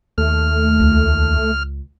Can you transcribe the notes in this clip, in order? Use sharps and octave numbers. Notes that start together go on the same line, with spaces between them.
D#2 A3 F6
C#2